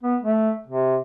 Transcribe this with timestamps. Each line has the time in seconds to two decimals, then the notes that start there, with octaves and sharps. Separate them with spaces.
0.03 B3
0.22 A3
0.67 C3